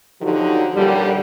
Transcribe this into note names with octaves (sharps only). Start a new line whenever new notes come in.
D3 F3 F#3 D#4 F#4 G4
F#2 A#2 D3 G3